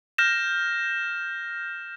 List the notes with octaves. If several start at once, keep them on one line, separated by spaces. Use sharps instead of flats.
F6 G6 A#6 E7